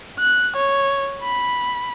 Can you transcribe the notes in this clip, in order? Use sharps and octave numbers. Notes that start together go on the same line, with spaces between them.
F#6
C#5
B5